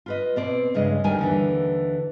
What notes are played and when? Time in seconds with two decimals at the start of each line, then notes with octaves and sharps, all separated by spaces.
0.06 F4 B4 D#5
0.36 B2 C4 D5
0.74 G2 C#3 G#3 D#5
1.04 D2 D#3 G3 A#4 G#5
1.19 D#2 D3 E3